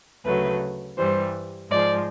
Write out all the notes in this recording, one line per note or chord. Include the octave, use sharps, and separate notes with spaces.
D2 C#3 F#3 A3 B4
G2 E3 G3 C5
G#2 F3 G#3 D5